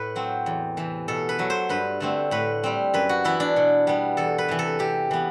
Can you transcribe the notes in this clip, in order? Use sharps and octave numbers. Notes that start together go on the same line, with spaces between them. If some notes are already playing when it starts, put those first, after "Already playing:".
Already playing: A2 B4
F#3 C4
E2
C3 E3
B2 A4
B4
F#3 A3
C5
G2 B4
D3 A3 C4
A2 B4
G3 C4
F#2 B4
F#4
E3 B3 E4
D4
B2
G3 B3
E2 A4
B4
C3 E3
A4
C3 G4
E3 B3